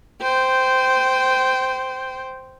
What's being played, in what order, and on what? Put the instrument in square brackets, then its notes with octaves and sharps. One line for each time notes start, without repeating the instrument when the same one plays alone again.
[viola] C5 G5